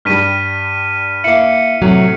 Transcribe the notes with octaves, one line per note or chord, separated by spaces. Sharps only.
G2 G3 F6 B6 D#7
A#3 E4 C#7
A2 C3 F#3